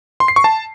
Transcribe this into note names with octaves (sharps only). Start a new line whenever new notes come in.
C6
C7
C#6
A5